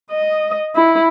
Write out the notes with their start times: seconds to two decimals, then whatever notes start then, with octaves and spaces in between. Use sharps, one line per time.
0.11 D#5
0.75 E4